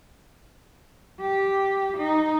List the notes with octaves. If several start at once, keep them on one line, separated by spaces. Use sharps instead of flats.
G4
D#4